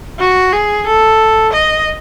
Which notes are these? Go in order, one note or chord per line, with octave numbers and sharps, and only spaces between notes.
F#4
G#4
A4
D#5